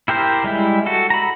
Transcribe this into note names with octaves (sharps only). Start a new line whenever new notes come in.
E4 G4 A#4 C5
G3 G#3 E4
F#4 A4
A#5 B5